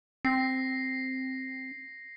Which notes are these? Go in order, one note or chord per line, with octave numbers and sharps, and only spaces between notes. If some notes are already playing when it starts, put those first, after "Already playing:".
C4 A#6 C7